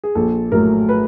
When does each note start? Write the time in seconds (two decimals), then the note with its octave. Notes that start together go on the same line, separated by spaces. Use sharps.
0.04 G#4
0.15 A#1 A4
0.52 A2 F#3 A3 A#4
0.89 B4